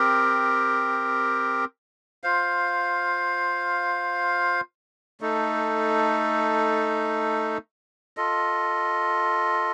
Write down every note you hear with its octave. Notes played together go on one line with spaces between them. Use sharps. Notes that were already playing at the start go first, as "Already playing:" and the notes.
Already playing: C4 G4 A#4
F4 C5 F5
A3 D#4 A4
F4 A4 D#5